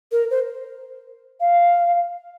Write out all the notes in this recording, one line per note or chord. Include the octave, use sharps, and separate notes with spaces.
A#4
C5
F5